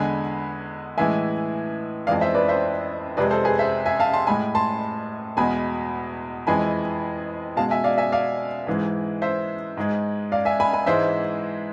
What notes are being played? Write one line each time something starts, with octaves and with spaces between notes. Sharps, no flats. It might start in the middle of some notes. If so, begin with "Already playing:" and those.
Already playing: E2 D3 G#3 G#5 B5
A2 E3 G#3 E5 G#5
F2 E3 G#3 D5 F5
C5 E5
B4 D5
C5 E5
F2 C3 G#3 B4 D5
A4 C5
G#4 B4
C5 E5
E5 G#5
F5 A5
A5 C6
A2 G#3 G#5 B5
A5 C6
E2 B2 G#3 G#5 B5
F2 E3 G#3 G#5 B5
B2 G#3 F5 A5
E5 G#5
D5 F5
E5 G#5
D5 F5
G#2 E3 G#3
C5 E5
G#2 G#3
D5 F5
E5 G#5
G#5 B5
G#5 B5
G#2 E3 G#3 C5 E5